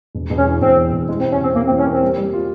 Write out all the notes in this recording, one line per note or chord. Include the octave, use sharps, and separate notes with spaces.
E1
E1
C#4
E3
E1 C4
E2
E1
E3 G#3
C4
C3
C#4
C3 C4
C3 A#3
C4
E3
C#4
A#3 C4
G3
G3
F4